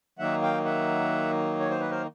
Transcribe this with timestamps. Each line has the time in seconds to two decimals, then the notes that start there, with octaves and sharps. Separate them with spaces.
0.19 D#3 F#3 A#3 D#4 E5 F#5
0.42 F5 G5
0.65 E5 F#5
1.60 C#5
1.70 C5
1.80 B4
1.90 A#4 C5